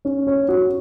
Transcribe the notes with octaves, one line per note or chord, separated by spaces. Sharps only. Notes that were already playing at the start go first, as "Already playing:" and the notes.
C#4
C#5
F#4